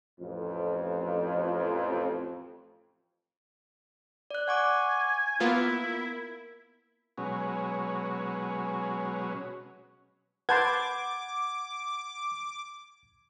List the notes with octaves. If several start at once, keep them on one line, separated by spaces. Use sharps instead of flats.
A1 F2
D5 F#6
F#5 G#5 C#6 D6
A#3 B3 E4 F4 A#4
B2 F#3 G#3 C#4
B4 F#5 A5 C6 D6 G6 G#6